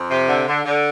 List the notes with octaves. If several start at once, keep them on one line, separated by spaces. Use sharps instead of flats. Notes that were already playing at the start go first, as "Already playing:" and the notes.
Already playing: F2
C3
D3
D3
D3